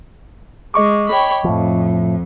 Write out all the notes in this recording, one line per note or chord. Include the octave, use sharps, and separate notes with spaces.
G#3 D#5 C#6 D6
C#5 G5 B5
F2 A2 F3